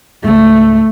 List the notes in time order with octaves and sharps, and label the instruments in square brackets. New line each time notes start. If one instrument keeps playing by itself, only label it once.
[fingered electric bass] C#2 G#2 [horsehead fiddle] A3